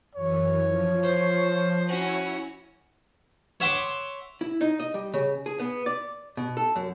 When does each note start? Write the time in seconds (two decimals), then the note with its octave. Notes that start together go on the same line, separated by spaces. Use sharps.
0.15 F#2 E3 C#5
0.67 F3
1.03 C5
1.89 C#4 E4 F#4 C#5
3.60 C#5 E5 F#5 C6 D6
4.41 E4
4.61 D#4
4.80 D#5
4.94 G3
5.14 C#3
5.46 G#4
5.60 B3
5.86 D5
6.37 B2
6.57 A4
6.76 F#2